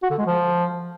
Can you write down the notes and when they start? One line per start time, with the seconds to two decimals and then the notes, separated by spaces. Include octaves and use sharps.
0.02 F#4
0.10 D3
0.18 G#3
0.26 F3